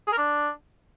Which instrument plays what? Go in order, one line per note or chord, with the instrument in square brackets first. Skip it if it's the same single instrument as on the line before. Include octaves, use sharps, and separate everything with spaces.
[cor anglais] G#4
A#4
D4